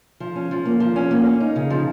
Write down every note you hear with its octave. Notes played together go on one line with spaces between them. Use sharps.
F3
C#4
F3
A#3
F3
C#4
A#3
C#4
D#4
C#3
F3